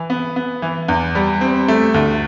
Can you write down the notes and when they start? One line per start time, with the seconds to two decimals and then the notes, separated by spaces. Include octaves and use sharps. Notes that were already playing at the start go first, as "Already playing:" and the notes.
Already playing: E3
0.10 B3
0.36 B3
0.62 E3
0.88 E2
1.15 G3
1.41 C4
1.68 A3
1.94 D2